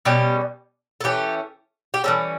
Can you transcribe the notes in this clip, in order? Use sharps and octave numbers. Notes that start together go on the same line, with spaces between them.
B2 G3 C#4 G4
A4
E3 A3 C#4 G4
G4
E3 G3 C#4 A4